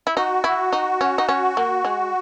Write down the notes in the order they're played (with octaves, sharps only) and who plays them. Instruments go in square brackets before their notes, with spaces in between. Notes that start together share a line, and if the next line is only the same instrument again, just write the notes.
[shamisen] E4
[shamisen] D#4 [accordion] F#4
[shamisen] E4
D#4
C#4
D#4
C#4
A#3
G#3